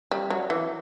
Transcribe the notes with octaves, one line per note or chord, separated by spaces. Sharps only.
G3
F#3
E3